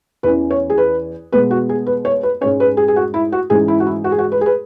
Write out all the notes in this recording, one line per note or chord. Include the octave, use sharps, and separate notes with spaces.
E2 E3 C#4 B4
C#5
G#4
B4
B2 G#3 B3 B4
F#4
G#4
B4
C#5
B4
G#2 G#3 C#4 C#5
B4
G#4
G#4
F#4
E4
F#4
G#2 E3 C#4 G#4
E4
F#4
E4
F#4
G#4
F#4
B4
G#4
B4